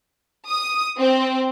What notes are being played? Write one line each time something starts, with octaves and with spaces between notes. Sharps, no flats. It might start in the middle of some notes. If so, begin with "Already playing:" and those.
D#6
C4